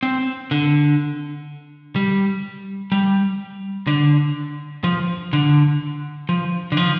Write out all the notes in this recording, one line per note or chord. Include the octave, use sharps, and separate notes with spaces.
C4
D3
G3
G3
D3
F3
D3
F3
D3
F3